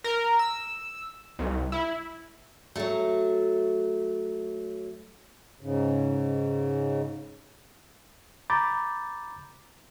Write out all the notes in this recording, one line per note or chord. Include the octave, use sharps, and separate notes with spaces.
A#4
E6
C2
E4
F#3 A3
G#2 C#3
A#5 B5 D6 G6 A6